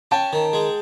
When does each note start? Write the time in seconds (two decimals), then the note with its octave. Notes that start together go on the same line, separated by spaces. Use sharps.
0.11 C#4 G5 A5
0.33 D#3
0.53 G#3